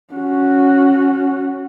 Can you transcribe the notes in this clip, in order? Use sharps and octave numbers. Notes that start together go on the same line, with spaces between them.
C#4 F#4